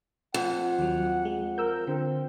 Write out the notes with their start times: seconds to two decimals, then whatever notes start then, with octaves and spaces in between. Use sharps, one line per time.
0.34 F2 F#5
0.78 D#2 F#3
1.25 G#3
1.58 A#4 E6 G6
1.87 D3 C4